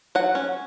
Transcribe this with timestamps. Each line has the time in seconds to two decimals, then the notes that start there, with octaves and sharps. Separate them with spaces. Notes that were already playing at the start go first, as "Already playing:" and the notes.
0.15 F#3 F#5
0.35 C#4